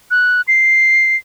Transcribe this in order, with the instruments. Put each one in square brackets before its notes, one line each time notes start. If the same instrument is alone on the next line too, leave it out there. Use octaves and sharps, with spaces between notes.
[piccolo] F#6
C7